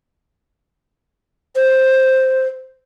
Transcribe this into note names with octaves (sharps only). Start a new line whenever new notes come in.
C5